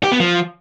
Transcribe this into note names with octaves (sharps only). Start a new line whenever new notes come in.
G4
B3
F3